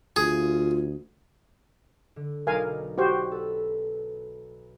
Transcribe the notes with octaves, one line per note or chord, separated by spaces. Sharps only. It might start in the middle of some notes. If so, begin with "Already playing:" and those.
D2 F4 G#4
D3
B1 D#4 A#4 D5 F5 G#5
F#4 G4 C5
A4 B4